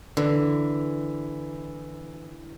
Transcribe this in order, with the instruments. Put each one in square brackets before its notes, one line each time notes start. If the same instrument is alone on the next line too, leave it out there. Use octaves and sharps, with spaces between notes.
[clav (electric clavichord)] D3 [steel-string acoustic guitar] E3